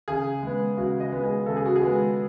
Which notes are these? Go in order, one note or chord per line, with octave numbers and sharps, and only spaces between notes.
C#3 G#4
G#3 B3
C#3 F#4
D#5
G#3 B3
G#4
C#3 A4
G#4
F#4
G#4
G#3 B3